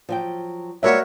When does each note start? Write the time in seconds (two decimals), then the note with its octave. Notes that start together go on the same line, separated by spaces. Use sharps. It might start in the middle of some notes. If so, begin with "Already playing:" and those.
0.09 F3 F#3 G5
0.83 G3 G#3 A#3 F#4 A#4 C#5 E5